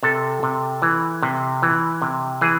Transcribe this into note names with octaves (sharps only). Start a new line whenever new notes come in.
C3 A4
C3
E3
C3
E3
C3
E3 G#4